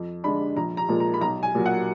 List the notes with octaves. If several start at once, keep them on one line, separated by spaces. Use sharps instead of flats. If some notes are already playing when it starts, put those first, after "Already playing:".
Already playing: F2
D3 G#3 D4 B5
A#1 A#5
A#5
A#2 F3 G#3
A#5
B5
B1 A#5
G#5
A#2 F#3
F#5